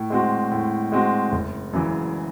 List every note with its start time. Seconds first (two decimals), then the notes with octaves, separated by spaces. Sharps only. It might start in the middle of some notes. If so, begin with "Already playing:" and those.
Already playing: A2
0.10 G#3 C4 F#4
0.51 A2
0.92 G#3 C4 F#4
1.32 F#1
1.73 F#2 C#3 E3